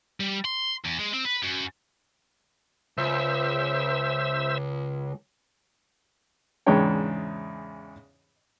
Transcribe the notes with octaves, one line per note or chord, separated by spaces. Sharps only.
G3
C6
E2
G#3
C4
B4
F#2
C#2 C5 E5 E6
E2 G#2 C#3 D4 C#5 G5